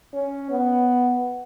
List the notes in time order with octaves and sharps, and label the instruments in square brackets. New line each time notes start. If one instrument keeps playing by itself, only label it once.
[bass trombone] C#4
B3